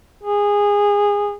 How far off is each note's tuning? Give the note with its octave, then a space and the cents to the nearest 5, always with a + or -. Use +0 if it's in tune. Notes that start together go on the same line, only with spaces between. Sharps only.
G#4 -20